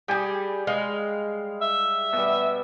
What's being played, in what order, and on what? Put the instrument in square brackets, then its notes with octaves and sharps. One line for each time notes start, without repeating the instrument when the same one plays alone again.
[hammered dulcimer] G3 G5 G#5 [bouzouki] G4 G#4
[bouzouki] G#3 [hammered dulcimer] F5
[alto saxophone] E5
[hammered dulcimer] B2 G3